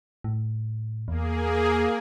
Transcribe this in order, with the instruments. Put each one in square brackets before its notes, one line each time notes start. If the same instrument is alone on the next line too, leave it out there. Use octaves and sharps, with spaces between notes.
[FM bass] A2
[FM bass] E2 [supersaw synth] A#3 G#4